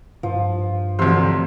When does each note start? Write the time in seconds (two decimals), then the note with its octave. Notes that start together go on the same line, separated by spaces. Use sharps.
0.23 G2 F3
0.99 D2 C3 E3 F3 C5